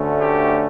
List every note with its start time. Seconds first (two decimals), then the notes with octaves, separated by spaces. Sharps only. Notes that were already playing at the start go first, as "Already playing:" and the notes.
Already playing: D2 D3 A3 C#4
0.20 G4